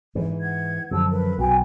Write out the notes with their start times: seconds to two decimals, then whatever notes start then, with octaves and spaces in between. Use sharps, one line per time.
0.15 G#2 E3
0.41 F#5 G#6
0.91 F#2 D3 F3 A5 E6
1.11 A#4 B4
1.38 B1 F#4 G5 G#5